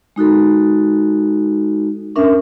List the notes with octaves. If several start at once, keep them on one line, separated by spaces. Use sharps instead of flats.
G#3 D#4 F#4 A4
C#4 D4 A#4 E5